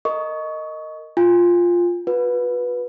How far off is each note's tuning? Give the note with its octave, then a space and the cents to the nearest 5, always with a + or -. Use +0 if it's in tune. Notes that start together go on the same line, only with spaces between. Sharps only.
A#4 -20 D#5 +0 C#6 +10
F4 +0 G#5 -30
F#4 -40 B4 -10